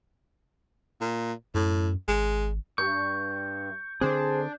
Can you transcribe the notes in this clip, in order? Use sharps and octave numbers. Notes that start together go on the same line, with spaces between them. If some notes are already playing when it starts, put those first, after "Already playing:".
A#2
F#2 A2
G#1 G#3
G2 C#6 G6
D3 C4 D4 G#4 C5